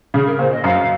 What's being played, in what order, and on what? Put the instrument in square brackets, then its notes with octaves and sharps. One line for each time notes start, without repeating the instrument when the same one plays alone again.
[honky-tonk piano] C#3 [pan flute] G#4
[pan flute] A#4
[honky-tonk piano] A#2 [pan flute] C5
[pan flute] D#5
[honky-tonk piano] F#2 [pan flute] F5